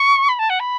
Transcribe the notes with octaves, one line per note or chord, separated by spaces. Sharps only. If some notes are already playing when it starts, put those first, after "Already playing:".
Already playing: C#6
B5
A5
F#5
B5